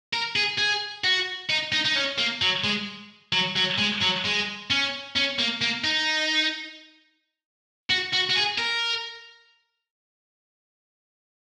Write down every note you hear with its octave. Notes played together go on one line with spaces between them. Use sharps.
A#4
G#4
G#4
F#4
D#4
D#4
D#4
C#4
A#3
F#3
G#3
F#3
F#3
G#3
F#3
G#3
C#4
C#4
A#3
A#3
D#4
F#4
F#4
F#4
G#4
A#4